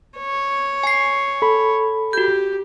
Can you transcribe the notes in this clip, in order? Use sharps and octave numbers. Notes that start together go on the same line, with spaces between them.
C#5
G#5 C7
A4 B5
F#4 G4 G6